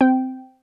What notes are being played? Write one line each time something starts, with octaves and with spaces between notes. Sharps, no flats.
C4 G5